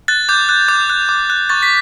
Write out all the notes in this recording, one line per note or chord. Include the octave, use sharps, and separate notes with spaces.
F#6 A6
D6 G6
F#6
D6 G6
F#6
D6
F#6
C#6 A6
B6